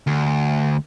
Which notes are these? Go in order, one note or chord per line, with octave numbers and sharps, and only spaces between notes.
D2